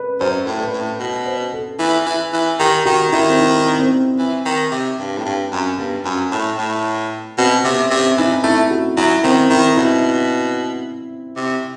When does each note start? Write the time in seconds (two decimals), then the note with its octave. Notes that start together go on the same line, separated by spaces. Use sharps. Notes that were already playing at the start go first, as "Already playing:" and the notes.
Already playing: B4
0.20 F#2 C5
0.46 A2
0.60 B4
0.73 A2
1.00 B2
1.26 C5
1.53 A4
1.79 E3
2.06 E3
2.33 E3
2.59 D#3 G4
2.85 D#3 F#4
3.12 D#3 E4
3.28 C4
3.39 D#4
3.79 C4
4.18 E3
4.46 D#3
4.71 C3
4.99 G2
5.18 A2
5.25 G2
5.52 F#2
5.78 G2 B3
6.04 F#2
6.32 A2
6.58 A2
7.38 B2 C4
7.64 C3 B3
7.91 C3 C4
8.17 E3 D#4
8.44 A3 E4
8.71 F#4
8.97 F#3 E4
9.24 D#3 C4
9.50 D#3 E4
9.77 B2 E4
11.37 C3